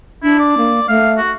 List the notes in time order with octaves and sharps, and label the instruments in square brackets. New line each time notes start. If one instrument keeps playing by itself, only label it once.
[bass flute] D4 [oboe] E4
[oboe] D5
[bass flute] A#3
[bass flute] A3 [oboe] F5
[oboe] F#4